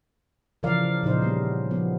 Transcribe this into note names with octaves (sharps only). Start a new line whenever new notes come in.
C#3 E3 F3 A#4 D5 F5
C#3
A#2 C#3 F3 D#4 C5
G3 B3
F3 B3